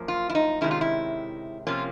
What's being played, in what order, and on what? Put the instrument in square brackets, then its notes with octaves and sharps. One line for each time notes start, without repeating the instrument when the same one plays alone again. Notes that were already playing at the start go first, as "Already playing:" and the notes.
Already playing: [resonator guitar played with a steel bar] F#2 F3 A#3
F4
E4
D#4
C3 D#3 G#3 C#4 E4
F4
E4
C3 F3 A#3 C#4 F4